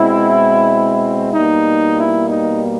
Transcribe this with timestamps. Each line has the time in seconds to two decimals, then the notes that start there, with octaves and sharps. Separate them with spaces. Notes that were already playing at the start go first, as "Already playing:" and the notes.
Already playing: B2 G#3 C4 E4
1.34 B2 G3 A#3 D#4
1.98 E4
2.29 D#4